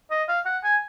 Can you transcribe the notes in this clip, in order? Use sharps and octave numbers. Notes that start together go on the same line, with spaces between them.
D#5
F5
F#5
G#5